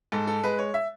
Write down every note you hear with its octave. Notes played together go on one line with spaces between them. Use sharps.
G#2 A4
A4
G#3 B4
C#5
E5